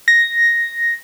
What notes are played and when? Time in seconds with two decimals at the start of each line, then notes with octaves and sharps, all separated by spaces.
0.08 A#6